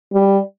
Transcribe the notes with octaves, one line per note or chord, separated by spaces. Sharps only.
G3